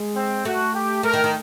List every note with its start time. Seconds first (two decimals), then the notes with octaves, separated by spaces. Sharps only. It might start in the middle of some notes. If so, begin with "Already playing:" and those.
Already playing: G#3
0.15 C4
0.45 A3 F#4
0.74 G4
1.03 A3 A#4
1.14 D#3
1.24 D#3